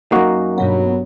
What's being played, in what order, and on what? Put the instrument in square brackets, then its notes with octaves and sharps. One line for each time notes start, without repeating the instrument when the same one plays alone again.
[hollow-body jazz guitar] F#2 A#3 [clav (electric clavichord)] D#4 F#4
[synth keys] G2 B2 B3 [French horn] F#3